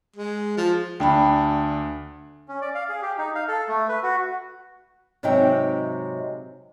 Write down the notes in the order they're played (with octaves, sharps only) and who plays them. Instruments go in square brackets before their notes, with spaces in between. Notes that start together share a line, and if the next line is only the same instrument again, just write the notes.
[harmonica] G#3
F3
[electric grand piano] D2 D4 [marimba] G5 B5
[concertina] C#4
D5
F5
G#4
G4
D#4
F5
A4
A3
B4
F#4
[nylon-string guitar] G#2 C3 F#3 D#4 E5 G5